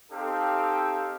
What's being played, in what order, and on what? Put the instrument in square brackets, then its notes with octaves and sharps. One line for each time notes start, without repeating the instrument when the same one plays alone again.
[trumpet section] C4 D#4 G4 A4 F5